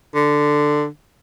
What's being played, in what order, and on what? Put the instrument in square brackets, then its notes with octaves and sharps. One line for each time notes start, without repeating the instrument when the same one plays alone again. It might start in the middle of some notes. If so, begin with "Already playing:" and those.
[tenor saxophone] D3